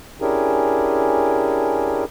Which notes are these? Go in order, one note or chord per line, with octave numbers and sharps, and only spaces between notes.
C#4 D4 E4 G4 G#4 A#4